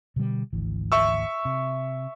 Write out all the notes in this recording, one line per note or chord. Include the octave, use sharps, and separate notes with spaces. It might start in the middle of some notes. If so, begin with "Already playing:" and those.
B2 D3 G3
G#1 D2 E3
E5 C#6 E6
C3